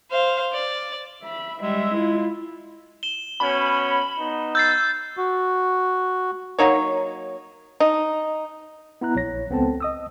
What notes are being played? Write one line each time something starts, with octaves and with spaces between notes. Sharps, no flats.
C5 F5
D5
E5 B5
G3 G#3 E5
E4 F4
E7 G7
B2 C#4 B5
B3 D#4
E6 G6 A6 C7
F#4
F#3 A#3 D#4 C#5
D#4
B3 E4 A#5 F#6
A#1 C#5 A#6
C#2 B3 C4 A4 A5
D#5 D#6 E6